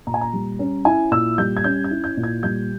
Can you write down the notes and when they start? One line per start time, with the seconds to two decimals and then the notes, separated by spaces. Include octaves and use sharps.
0.07 A#2 A#5
0.14 G#5
0.21 A#5
0.33 G3
0.59 C#4
0.85 E4 G#5
1.12 A#2 E6
1.38 G3 G6
1.57 G#6
1.64 C#4 G6
1.84 G#6
1.91 E4
2.04 G6
2.17 A#2
2.23 G#6
2.43 G3 G6